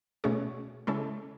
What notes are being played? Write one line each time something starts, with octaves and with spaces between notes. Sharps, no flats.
B2 A3 C#4 G#4 C#5
C#3 G#3 C#4 E4 A4